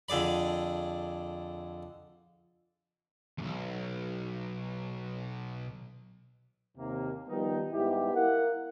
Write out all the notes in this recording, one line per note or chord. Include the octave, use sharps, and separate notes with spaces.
F2 D3 G#4 D5 B5
B1 E2
D#2 C3 A#3
D#3 F3 G3 B3 D#4
G#2 G3 B3 E4 G4
E4 A#4 F5 F#5